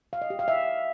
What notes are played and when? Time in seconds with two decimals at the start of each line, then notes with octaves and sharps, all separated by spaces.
0.13 F5
0.22 D#5
0.30 G4
0.39 F5
0.48 E5